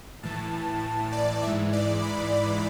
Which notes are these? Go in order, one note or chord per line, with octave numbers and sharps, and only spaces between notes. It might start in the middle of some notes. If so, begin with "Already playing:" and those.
A2 E3 A5
D5
G#2 E3 E5
D5
B5